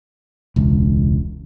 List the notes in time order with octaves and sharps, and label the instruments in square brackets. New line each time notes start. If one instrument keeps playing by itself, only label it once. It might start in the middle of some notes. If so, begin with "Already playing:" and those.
[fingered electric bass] E1 C#2